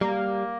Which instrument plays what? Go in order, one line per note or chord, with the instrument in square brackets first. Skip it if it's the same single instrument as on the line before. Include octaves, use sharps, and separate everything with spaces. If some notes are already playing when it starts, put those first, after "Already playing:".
[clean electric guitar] G3 [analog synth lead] A#3